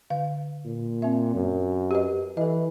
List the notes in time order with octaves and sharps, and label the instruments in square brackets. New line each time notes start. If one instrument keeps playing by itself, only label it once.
[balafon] D3 F5
[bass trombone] A#2
[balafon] C4 E5
[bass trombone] F#2
[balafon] G4 B4 D#5
[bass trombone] E3 [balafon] A4 D#5